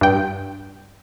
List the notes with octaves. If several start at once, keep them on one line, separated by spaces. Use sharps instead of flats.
G2 G5